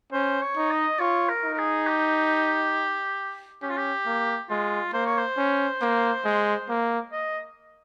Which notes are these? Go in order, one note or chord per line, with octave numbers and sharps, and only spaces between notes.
C#4 C5
C#5
D#4
D#5
F4 C#5
A#4
D#4
A#4
G#4
G4
C#4 G4
F4
G4
A#3
G#3 F4
A#3 C5
C#5
C5
C#4
A#3
G#3
A#3
D#5